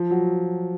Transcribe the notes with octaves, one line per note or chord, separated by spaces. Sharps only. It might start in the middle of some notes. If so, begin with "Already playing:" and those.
Already playing: F3
F#3